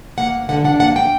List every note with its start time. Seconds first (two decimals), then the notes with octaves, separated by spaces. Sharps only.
0.18 A#3 F#5
0.34 D2
0.49 D3 F#5
0.64 D4 F#5
0.79 A#3 F#5
0.96 G5